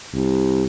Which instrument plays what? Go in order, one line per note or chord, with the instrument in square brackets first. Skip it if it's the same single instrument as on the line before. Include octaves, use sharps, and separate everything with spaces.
[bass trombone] C2